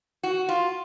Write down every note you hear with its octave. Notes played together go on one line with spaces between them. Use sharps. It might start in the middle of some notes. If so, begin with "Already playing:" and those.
F#4
F4